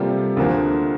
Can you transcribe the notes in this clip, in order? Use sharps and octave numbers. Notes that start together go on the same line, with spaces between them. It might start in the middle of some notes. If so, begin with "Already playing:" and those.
Already playing: C3 G3 A#3 F4 A4
D2 D3 F3 A#3